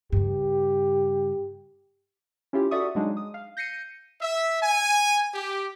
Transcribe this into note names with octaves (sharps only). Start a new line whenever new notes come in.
G2 C#3 G4
C#4 E4 F4 G4
F#4 A4 D5 E5 C#6 D#6
F#3 G#3 D4 D#4
D#6
F5
G6 A#6 C7 C#7 D#7
E5
G#5
G4